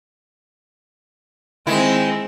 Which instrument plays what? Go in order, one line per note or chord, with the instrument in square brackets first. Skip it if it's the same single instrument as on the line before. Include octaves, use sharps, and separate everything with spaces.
[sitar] D#3 E4 [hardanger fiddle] G#3 C4